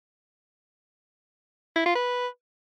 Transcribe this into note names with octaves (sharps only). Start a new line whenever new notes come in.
E4
F4
B4